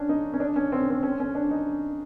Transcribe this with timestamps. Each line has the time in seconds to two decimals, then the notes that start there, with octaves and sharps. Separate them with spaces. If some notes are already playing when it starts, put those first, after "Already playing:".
Already playing: C#4 D4
0.09 D#4
0.33 C#4
0.40 D4
0.56 C#4
0.72 C4
0.81 C#4
0.90 C4
1.03 C#4
1.20 C#4
1.35 D4
1.51 D#4